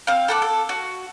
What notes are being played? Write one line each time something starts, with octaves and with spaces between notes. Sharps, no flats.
C4 F5
A4 F#5 D6
A4
F#4